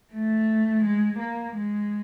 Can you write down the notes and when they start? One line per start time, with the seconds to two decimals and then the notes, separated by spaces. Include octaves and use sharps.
0.14 A3
0.84 G#3
1.19 A#3
1.55 G#3